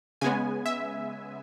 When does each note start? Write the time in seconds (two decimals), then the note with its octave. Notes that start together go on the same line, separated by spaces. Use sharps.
0.21 C#3 G#3 B3 G#5
0.66 E5